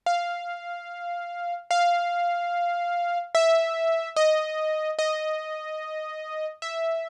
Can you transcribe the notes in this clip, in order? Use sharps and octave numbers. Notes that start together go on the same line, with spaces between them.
F5
F5
E5
D#5
D#5
E5